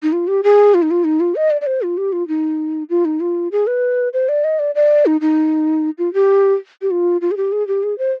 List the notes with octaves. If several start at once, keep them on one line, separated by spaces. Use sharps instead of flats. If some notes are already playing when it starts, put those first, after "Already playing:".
D#4
F4
G4
G#4
F4
D#4
F4
D#4
F4
D#5
D5
D5
C5
F4
G4
F4
D#4
F4
D#4
F4
G#4
B4
C5
D5
D#5
D5
D5
D#4
D#4
F4
G4
G4
F4
F4
G#4
G4
G#4
G4
G#4
C5